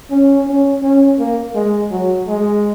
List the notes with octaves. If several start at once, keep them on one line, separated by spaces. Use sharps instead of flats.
C#4
C#4
C#4
A#3
G#3
F#3
G#3